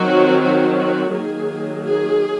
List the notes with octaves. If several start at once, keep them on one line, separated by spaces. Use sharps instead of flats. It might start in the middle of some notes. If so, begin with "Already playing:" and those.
Already playing: D#3 F#3 C4 F#4
F#4
F#4
D#3 F#3 A#3 G#4
G#4